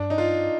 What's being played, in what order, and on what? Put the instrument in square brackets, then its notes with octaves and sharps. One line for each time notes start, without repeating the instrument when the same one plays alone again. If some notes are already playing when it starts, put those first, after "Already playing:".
Already playing: [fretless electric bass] G2 [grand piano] D4
[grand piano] D#4
F4